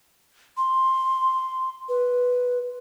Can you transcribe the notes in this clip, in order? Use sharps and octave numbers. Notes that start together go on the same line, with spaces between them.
C6
B4